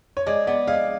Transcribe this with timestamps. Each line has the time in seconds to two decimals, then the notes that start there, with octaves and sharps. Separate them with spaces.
0.17 C#5
0.27 G#3 D5
0.47 B3 D5
0.67 G#3 F5